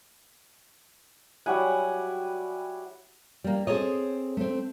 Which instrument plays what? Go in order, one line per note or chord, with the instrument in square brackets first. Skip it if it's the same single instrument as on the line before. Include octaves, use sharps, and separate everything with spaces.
[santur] F#3 G3 G#5 [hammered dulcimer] E4 F#5
[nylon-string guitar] G3 A#3
C4 G#4 A4 C#5 D#5
A3 C4